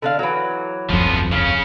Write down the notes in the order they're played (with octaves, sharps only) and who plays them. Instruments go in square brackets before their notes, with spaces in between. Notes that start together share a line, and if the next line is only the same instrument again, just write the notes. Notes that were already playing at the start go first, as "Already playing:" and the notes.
[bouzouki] D3 D4 F5
E3 F#3
[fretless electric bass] D1 G1 F2 [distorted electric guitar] F3 B3
[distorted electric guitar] C#3 C#4 [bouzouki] F5